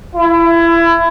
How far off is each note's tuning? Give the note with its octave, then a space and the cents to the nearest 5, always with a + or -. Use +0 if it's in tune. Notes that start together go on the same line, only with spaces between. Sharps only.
E4 +25